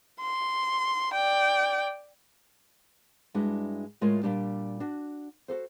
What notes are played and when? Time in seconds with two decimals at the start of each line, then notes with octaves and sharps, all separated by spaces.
0.21 C6
1.14 D5 G5
3.34 G2 G#3 D4 E4 F#4
4.01 A2 G#3 F4 A#4 C#5
4.23 A#2 G3 D4 G4
4.80 D4 F#4
5.48 F#4 G4 A4 C5